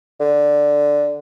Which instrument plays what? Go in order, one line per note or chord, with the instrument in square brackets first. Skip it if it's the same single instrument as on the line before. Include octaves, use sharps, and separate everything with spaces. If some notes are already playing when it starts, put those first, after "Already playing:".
[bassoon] D3